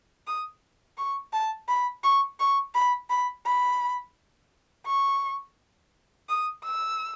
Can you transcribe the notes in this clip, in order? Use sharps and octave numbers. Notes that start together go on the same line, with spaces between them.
D#6
C#6
A5
B5
C#6
C#6
B5
B5
B5
C#6
D#6
E6